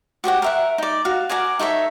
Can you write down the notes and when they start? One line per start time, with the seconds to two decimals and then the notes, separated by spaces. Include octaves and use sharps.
0.24 F#4 G4 C#5 F#5
0.42 A#4 E5 F#5
0.78 D#4 D5
1.05 F#4 F5
1.29 F#4 A#4 D5 G#5
1.59 D#4 A4 C#5 E5